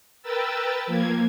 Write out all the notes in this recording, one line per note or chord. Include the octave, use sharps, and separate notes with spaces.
A#4 B4 G5 E6 A6
F3 A#3 G#6